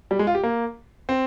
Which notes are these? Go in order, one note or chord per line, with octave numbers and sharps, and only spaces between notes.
G3
G#3
F4
G4
A#3
C4